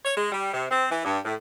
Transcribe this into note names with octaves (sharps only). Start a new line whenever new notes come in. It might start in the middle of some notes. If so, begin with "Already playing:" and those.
C#5
G#3
G3
C3
C4
E3
G2
A2